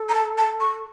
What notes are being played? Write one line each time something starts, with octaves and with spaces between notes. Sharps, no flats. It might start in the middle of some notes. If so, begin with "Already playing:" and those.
Already playing: A4
A#5
A5
A5
C#6